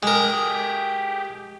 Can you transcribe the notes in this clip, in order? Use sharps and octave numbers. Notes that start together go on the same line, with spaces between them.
G#3 G4 G#4 A#4